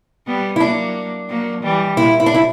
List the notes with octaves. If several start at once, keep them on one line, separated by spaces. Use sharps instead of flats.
G3 B3
E4
F#3 A#3 D4
F#3 A#3
E3 G3
A#2 E4
E4
D4
E4